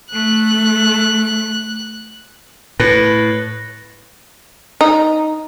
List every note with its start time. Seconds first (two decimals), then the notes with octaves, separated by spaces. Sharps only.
0.13 A3 F#6
2.80 A2 B4 A#6
4.81 D#4